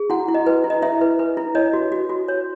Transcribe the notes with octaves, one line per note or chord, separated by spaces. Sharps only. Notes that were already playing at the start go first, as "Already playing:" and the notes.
Already playing: G#4
E4 F#4 F#5
E4
D#5
B4
E4
D#5
E4 E5
B4
B4
E4
C#5 D#5
F#4
F#4
F#4
C#5